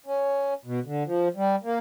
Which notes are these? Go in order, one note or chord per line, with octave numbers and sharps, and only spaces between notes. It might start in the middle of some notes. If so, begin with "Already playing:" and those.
C#4
B2
D3
F3
G3
A#3